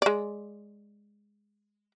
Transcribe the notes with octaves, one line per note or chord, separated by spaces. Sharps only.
G#3 D5